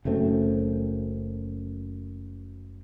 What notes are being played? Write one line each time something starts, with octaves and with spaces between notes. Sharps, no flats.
F#1 F#2 A3 C4